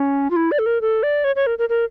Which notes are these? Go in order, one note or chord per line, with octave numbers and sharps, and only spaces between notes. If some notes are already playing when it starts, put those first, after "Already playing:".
Already playing: C#4
F4
E4
D5
A4
A#4
A4
D5
C#5
C#5
A#4
A#4
A#4